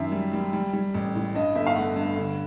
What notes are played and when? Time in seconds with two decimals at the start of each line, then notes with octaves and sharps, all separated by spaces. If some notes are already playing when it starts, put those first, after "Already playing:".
Already playing: F#2 D#3 E5
0.12 G3
0.33 G3
0.53 G3
0.73 G3
0.94 A1
1.15 A2
1.35 G2 D#5
1.55 G1 E5
1.67 F5
1.75 A3 F#5
1.96 G2
2.17 D3